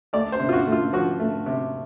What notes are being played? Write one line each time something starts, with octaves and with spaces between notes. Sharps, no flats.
A3 D5
C5
C3
F4
F#4
A3
F4
F3 F#4
A3
C3